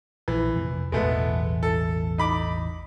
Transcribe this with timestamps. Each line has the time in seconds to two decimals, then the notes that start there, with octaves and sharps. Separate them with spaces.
0.28 A#1 E3
0.56 F2 C3 F3
0.92 A1 E2 B2 G#3 A3 B3
1.63 A4
2.18 D#4 B5 D6